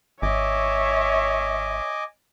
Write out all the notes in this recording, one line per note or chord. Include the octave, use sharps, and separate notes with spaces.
G#1 C#5 D#5 E5 G#5 D6